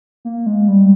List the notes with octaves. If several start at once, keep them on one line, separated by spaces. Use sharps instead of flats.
A#3
G#3
G3